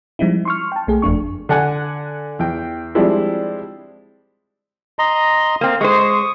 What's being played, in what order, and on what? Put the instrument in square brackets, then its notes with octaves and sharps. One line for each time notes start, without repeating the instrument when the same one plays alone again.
[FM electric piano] F3 G3 G#3 C4 D#4 E4
C6 C#6 F6
G5 A5
B1 A3 G#4
G1 F2 A3 D4 C#6
[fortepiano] D3 D5 F#5 G#5
E2 G5
F3 G3 G#3 C4 D4 E4
[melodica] D#5 A#5 C6
[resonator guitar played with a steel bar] A#3 C4
[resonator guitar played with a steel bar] G#3 C5 [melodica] C#6 D#6